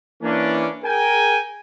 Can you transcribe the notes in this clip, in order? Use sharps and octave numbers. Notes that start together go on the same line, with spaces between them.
E3 A#3 C#4 D4
G#4 A#4 G5 G#5